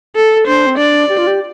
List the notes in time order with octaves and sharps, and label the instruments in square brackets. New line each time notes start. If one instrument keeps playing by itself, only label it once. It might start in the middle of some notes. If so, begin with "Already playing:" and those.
[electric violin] A4
[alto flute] D4 [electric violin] C5
[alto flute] C4
[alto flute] D4 [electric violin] D5
[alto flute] G4
F4
G4